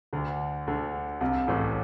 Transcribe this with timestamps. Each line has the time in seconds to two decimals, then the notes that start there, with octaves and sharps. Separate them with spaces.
0.13 D2 D3
0.67 D2 D3
1.21 C2 C3
1.48 A1 A2